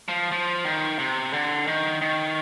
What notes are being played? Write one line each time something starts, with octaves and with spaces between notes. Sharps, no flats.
F3
F3
D#3
C3
D3
D#3
D#3